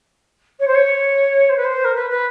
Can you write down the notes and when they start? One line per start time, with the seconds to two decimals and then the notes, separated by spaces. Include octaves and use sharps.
0.59 C#5
0.67 C5
0.74 C#5
1.49 C5
1.56 B4
1.64 C5
1.84 A#4
1.95 B4
2.10 B4